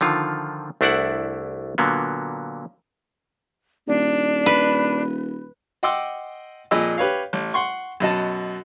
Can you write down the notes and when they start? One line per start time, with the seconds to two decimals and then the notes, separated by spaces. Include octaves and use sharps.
0.01 D3 D#3 F3 F4
0.81 C2 A3 D4 E4 D5 F#5
1.78 A#2 D3 F#3 A#3 B3
3.88 D#1 D4
4.46 B4
5.83 D#5 F#5 G5 C6 D6 E6
6.71 F2 A#2 G#4 D#5 B5 E6
6.98 G4 B4 C#5 F5
7.33 A1
7.54 F#5 C6 C#6
8.00 F#2 B2 D#5 A5